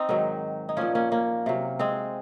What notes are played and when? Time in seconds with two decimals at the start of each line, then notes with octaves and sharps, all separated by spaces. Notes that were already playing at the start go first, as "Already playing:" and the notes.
Already playing: C4 D#4
0.09 G#2 D#3 F#3
0.69 D#4
0.77 A#2 F3 A#3 C#4
0.95 A#3 C#4
1.12 A#3 C#4
1.46 C3 F#3
1.79 G#3 C4